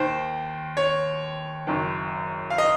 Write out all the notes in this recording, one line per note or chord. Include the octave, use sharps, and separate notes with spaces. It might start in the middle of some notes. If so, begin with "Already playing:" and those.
Already playing: D#2 D#3 C5
C#5
F#1 F#2 D#3
F5
D#5